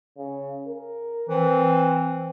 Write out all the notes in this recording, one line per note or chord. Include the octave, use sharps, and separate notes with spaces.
C#3
A#4
E3 C4